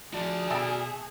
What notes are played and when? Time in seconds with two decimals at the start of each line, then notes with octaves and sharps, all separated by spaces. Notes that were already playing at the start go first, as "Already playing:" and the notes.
0.14 D3 F3 F#4 G#4 D5 A5
0.50 B2 A3 A4 G5